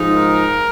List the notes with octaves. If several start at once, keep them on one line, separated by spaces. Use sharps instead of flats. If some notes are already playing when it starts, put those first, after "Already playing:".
Already playing: G#2 F3 G#3 D#4
A#4